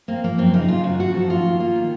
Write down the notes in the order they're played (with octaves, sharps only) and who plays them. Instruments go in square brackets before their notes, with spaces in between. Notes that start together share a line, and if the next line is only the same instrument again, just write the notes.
[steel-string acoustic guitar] A#3 C4
F3 A#3
F#2 C4
C#3 D#4
C#3 F4
F#2 F#4
F#2 F#4
F3 A4
D#3 F4
A#3
A#3 F4
D#3